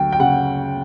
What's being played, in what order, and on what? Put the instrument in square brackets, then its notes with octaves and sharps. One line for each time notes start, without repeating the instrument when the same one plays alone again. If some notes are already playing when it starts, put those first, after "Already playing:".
Already playing: [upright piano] D2 F#3 G5
G5
C#3 F#5